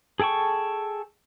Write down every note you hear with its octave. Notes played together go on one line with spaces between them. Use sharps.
G#4 A4 G5 A5 C#6